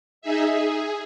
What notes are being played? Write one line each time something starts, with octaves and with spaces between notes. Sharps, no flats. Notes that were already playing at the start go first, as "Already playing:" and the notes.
D#4 G#4 E5
G#4